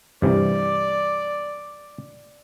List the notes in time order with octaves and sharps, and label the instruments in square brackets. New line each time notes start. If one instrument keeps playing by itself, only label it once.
[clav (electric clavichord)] G2 C3 E3 [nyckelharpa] D5